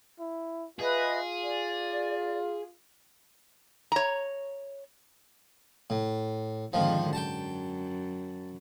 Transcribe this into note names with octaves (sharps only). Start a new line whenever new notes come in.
E4
F4 G#4 B4 D#5 E5
D5
C#5 A#5
A2
F2 G#2 D3 D#3 F3
F#2 G5 A5